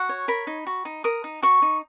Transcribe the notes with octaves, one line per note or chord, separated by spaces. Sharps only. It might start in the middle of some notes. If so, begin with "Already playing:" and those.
Already playing: F#4 F#5
C#5
A#4 B5
D#4
F#4
D#4
A#4 D#6
D#4
F#4 C#6
D#4